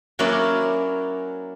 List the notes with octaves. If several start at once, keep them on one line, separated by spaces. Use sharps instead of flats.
F#3 A#3 C#4 E4 A#4 D5